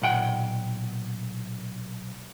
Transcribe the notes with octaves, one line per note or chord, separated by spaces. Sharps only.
B1 A#2 F#5 G5